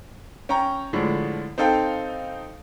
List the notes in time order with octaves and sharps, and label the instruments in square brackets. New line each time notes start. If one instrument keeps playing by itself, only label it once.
[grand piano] C#4 G5 A#5
A2 D3 F3 G#3
C4 D#4 A4 F5 G5